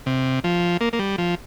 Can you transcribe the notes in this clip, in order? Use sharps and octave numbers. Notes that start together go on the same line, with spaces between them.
C3
F3
A#3
A#3
G3
F3